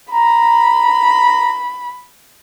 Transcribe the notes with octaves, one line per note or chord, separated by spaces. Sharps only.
A#5 B5